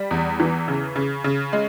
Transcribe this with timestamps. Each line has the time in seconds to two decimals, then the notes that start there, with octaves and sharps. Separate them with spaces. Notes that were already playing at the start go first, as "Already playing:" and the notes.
Already playing: G3
0.11 E2
0.40 E3
0.68 C#3
0.96 C#3
1.24 C#3
1.53 G#3